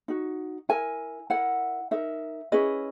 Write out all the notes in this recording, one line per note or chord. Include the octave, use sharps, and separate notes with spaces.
D#4 F#4
E4 A#4 G#5
E4 A#4 F#5
D#4 A#4 E5
C#4 E4 G#4 B4 D#5